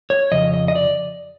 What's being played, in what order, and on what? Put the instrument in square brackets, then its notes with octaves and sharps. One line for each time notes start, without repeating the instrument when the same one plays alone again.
[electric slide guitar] C#5
F2 C#3 D#5
D#5
D#5
D5